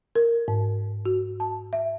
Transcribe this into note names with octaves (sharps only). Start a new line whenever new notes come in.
A#4
G#2
F#4
A5
E5